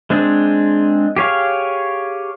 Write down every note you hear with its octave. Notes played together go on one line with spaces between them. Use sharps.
G#3 C4 D4 G#4
G4 G#4 C#5 F5